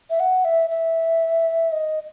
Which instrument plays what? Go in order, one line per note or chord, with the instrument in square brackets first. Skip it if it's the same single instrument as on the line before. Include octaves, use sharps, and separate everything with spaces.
[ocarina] E5
F#5
E5
E5
D#5